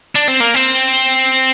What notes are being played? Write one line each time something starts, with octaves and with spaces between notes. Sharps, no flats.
D4
C4
A#3
C4